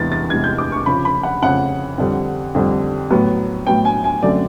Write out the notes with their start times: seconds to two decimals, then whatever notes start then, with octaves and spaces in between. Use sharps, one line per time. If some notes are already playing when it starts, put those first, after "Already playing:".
Already playing: E2 C3 E3 G#3 A6
0.12 A6
0.30 E2 C3 E3 G#3 G#6
0.44 G6
0.58 D6
0.72 C#6
0.86 F2 C#3 F3 B5
1.05 B5
1.23 F#5
1.42 F2 C#3 F3 F#5
1.98 F2 D3 G3
2.55 F2 D3 G3
3.10 A2 F#3 B3
3.67 A2 F#3 B3 G5
3.85 G#5
4.04 G#5
4.22 F#2 D3 F#3 A3 C4 D5